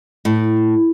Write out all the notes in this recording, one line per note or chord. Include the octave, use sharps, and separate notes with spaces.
A2